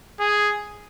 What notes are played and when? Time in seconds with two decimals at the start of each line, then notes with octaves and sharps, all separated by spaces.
0.20 G#4